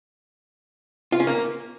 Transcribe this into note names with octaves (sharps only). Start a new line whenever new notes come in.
F4
C#4
A#3